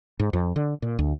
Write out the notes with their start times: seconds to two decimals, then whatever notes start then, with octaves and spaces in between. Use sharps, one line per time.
0.19 G#2
0.33 F2
0.56 D3
0.82 A#2
0.99 D2